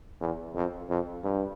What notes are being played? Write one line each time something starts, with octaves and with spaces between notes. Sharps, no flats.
E2
F2
F2
G2